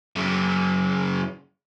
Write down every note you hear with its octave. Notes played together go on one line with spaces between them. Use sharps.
F#2 C#3